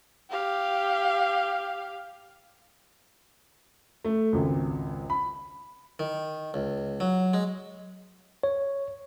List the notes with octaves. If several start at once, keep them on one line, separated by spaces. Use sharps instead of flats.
G4 F5
A3
G#1 C#2
B5
D#3
C#2
F#3
G#3
C#5